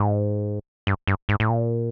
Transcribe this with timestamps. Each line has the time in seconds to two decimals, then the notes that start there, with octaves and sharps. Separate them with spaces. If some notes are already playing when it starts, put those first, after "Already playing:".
Already playing: G#2
0.87 G2
1.07 G2
1.29 G#2
1.40 A2
1.50 A#2